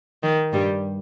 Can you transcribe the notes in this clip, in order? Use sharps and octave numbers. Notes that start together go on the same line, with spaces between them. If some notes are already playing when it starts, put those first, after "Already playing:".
D#3
G2 G3